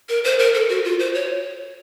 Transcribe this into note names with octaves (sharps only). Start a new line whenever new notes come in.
A#4
C5
A#4
A4
F#4
F4
C5
C#5